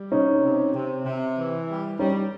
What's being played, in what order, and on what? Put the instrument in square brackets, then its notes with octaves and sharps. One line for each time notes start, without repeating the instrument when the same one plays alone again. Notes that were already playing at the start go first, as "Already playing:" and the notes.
Already playing: [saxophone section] G3
[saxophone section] C3 [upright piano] C#4 D#4
[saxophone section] C3
C3
C3
E3
G3
[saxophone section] G3 [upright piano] C#4 D#4